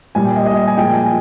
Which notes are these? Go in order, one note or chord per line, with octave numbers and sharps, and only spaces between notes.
A#2 G3 G#5
G5
D#5
D#5
G#5
A#2 F3 G#3 G5
G#5